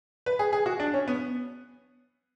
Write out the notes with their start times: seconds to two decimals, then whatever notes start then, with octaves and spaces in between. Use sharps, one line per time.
0.26 B4
0.39 G#4
0.53 G#4
0.66 F#4
0.80 D4
0.94 C#4
1.08 B3